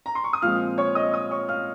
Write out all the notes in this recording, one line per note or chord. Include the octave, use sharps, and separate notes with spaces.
A#5
C6
C#6
D#6
A#2 F3 G#3 C4 F5 F6
C#5 C#6
D#5 D#6
D#5 D#6
C#5 C#6
F5 F6